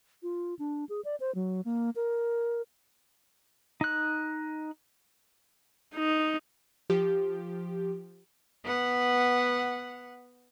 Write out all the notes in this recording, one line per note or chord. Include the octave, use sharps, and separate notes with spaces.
F4
D4
G#4
D5
C5
F#3
A#3
A#4
D#4 F#6
D#4
F3 G4
B3 F#5